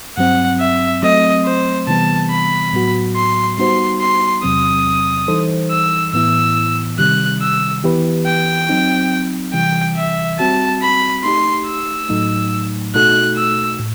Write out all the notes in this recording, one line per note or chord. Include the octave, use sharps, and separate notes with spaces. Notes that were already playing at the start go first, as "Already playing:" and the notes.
G2 F#3 C4 F#5
E5
F#3 A3 C4 D#5
C5
C3 E3 G3 B3 A5
B5
A2 F#3 B3 F#4
C6
G3 B3 D#4 F#4 C5 C6
C6
E2 C3 F#3 C4 D#6
E3 G3 D#4 A4 C5
E6
A2 E3 B3 E4 E6
C3 D#3 G3 F#6
E6
E3 B3 E4 G4 B4
G5
F#3 C4 D#4
C3 E3 G3 G5
E5
G3 C4 F#4 A5
B5
A3 D#4 G4 C6
E6
A2 F#3 A3 D#4
B2 A3 D#4 F#4 A4 F#6
E6
A2